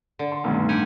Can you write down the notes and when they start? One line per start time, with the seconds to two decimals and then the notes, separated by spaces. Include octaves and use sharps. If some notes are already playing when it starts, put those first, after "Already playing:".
0.19 D3
0.32 C6
0.44 B1 G2 D#3 A3 C4
0.69 A2 D4 G4 F#5 G#5